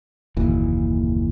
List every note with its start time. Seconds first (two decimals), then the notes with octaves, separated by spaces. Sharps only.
0.37 F#1 D#2 A#2 E3